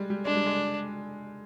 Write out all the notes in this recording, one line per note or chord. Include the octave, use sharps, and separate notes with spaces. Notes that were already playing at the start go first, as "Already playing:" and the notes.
Already playing: G3 G#3
G3
G#3 D4
G3
G#3